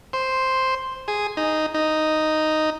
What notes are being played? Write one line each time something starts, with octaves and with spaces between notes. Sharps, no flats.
C5
G#4
D#4
D#4